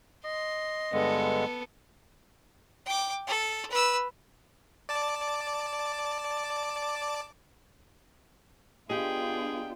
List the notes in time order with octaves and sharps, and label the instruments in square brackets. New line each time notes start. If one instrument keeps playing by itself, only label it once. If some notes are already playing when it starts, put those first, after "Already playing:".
[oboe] D#5 [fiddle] C6
[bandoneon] G2 D3 G#3 [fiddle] B3 A4
[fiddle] G5 D6
A4
B4 E6
[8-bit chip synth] D5 A5 D6
[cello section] B3 D4 F4 [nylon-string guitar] G4 D#5 [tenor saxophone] G#4 [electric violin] G5